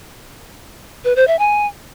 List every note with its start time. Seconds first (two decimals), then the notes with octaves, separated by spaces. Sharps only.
1.04 B4
1.16 C5
1.27 E5
1.39 G#5